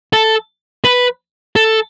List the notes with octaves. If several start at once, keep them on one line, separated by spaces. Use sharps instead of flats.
A4
B4
A4